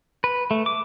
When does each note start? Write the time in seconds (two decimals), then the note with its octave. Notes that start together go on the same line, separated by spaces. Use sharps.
0.24 B4
0.51 A3
0.66 D6